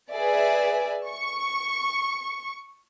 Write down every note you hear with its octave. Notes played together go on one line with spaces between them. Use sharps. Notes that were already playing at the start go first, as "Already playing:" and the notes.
G#4 B4 D5 E5
C#6